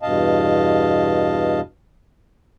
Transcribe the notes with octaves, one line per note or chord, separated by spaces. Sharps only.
E2 G2 B2 D#5 F5 A5